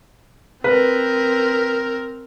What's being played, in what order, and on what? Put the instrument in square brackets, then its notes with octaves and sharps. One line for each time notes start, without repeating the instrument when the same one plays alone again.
[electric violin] C4 A#4 [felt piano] B4